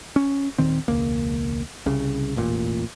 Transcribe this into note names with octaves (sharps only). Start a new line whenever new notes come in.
C#4
D#1 D#3 C4
E1 C#2 A#3
C2 C#3
E1 A1 A#2